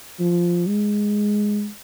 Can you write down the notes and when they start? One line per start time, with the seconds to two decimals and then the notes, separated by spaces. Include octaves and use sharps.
0.20 F3
0.67 G#3